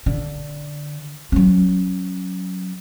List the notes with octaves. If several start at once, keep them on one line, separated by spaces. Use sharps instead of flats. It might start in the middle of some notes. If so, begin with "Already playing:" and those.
D3
F#3 C#4